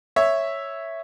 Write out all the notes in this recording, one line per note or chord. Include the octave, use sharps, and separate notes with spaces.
C#5 E5